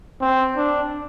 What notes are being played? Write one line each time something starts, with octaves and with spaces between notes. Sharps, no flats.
C4
D4